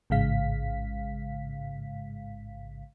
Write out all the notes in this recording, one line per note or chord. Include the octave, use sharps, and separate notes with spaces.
A1 G#2 C#3 G#3 F5 B6